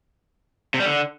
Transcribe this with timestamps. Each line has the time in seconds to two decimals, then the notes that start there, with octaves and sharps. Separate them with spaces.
0.74 C3
0.80 G3
0.86 D3